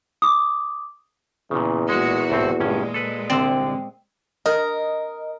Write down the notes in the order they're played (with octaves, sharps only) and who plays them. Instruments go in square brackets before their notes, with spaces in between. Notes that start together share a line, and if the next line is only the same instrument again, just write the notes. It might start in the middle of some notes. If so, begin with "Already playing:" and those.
[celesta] D6 D#6
[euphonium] E2 [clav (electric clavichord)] A#2 C#3
[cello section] A#2 F#4 [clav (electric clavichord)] G#3
[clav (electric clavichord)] C2 A2 C4
[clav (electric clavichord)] G1 G2 C#4 [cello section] A#2 G#3
[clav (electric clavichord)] A4 B4
[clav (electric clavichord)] C2 D3 D5 [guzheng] C4
[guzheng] A#4 [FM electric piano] D#5